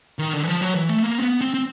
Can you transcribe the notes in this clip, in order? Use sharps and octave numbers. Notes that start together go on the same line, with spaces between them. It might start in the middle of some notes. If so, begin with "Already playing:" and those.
D#3
D3
E3
F3
F#3
E3
A3
A#3
C4
B3
C4
C4